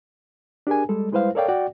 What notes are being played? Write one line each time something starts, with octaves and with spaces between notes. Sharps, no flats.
D4 G4 G#4 A#4 G#5
G3 G#3 A4
G3 G#3 E4 B4 C5 F5
A4 A#4 C#5 D5 F5 G5
F#4 D5 F#5 G5